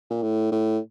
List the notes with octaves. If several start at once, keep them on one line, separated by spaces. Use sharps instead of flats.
A#2
A2
A2